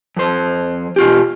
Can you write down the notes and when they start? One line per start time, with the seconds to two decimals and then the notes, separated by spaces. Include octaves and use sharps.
0.17 F2 C5
0.96 B2 F4 G4